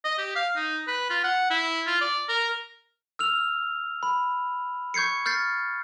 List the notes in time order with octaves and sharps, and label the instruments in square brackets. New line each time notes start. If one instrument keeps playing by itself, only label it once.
[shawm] D#5
G4
F5
D#4
B4
F4
F#5
E4
F4
D5
A#4
[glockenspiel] E6 F6 F7
B5
C#6 G6 G#6 C7 C#7
F6 G6 A6 C7